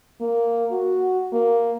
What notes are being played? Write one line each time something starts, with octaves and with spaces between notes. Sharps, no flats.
A#3
F#4
A#3